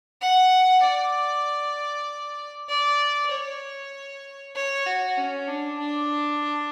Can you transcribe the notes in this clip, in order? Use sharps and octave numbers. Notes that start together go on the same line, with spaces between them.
F#5
D5
D5
C#5
C#5
F#4
C#4
D4
D4